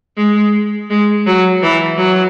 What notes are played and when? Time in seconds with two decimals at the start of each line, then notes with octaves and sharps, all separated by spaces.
0.17 G#3
0.90 G#3
1.26 F#3
1.62 E3
1.97 F#3